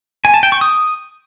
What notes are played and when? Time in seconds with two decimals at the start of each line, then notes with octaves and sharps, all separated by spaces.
0.25 G#5
0.34 A5
0.43 G5
0.52 C#6
0.61 D#6